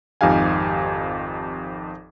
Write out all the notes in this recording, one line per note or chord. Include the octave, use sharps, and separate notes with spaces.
G#1 F2 D#4 G4 F5 G#5